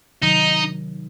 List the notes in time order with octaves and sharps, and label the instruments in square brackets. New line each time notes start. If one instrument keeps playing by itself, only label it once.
[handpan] C3 D#3 F#3 [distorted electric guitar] D#4